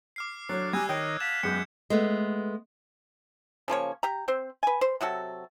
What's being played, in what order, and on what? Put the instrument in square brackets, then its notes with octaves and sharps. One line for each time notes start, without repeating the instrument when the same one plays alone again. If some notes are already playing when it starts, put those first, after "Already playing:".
[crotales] D6 F6 C7
[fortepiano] F#3 [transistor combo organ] D4 A4 [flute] C#5
[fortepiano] G3 [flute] G#5 [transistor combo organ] A#5 D#6 [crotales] E6 F#6 G#6
[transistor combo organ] D#3 A#4 D#5 [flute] C#5 [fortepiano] G5
[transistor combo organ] F5 F#5 A5 [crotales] E6 E7 [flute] B6
[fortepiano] F#2 G#3 [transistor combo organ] B3 G5 [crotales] G6 C#7
[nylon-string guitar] G#3 A3 B3
[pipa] C#3 F3 A#3 C#5
G4 A#5
C4 C5
B4 G#5
C5
C3 F#3 F#4 A4